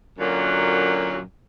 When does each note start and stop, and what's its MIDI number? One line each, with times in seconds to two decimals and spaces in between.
0.18 1.19 42
0.18 1.19 46
0.18 1.19 50
0.18 1.19 54